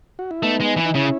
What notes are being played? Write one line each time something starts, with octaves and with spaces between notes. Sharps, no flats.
F#4
E4
A3 B3 D#4
G#3
E3
D#4
C#3 C#4 E4